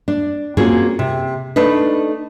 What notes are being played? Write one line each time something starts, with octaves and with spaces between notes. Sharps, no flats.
D4
A#3 C4 C#4 F4 F#4 G#4
C3
A3 D4 D#4 B4